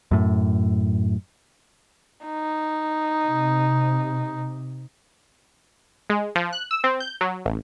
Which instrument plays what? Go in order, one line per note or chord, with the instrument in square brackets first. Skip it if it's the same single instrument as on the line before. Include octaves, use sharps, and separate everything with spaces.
[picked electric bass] F#2 A2
[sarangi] D#4
[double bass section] C3
[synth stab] G#3
F3
F#6
E6
C4
G6
F#3
A1